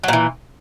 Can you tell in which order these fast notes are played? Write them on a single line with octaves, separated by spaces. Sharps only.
F#3 A#2 E3